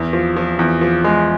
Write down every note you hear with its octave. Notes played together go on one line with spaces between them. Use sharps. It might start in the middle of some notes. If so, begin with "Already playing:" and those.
Already playing: E2
F3
F3
E2
F3
G#3